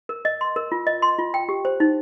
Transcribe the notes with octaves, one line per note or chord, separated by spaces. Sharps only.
A#4
D#5
C6
A#4
F4
D#5
C6
F4
G5
G4
C5
D#4